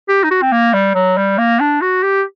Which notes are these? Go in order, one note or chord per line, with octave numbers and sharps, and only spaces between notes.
G4
D#4
F#4
C4
A#3
G3
F#3
G3
A#3
D4
F#4
G4